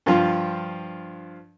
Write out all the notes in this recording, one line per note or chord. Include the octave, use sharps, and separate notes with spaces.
G2 F3 F4